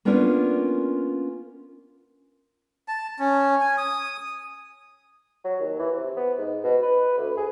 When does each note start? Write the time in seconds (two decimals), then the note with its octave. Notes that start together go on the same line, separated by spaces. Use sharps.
0.05 A#3 B3 C#4 D4 F4 A#4
2.88 A5
3.19 C#4
3.61 G#5
3.78 D#6
5.44 F#3
5.59 D#2
5.79 E3
5.96 C3
6.17 B3
6.38 G#2
6.64 B2
6.82 B4
7.18 D2
7.37 G#4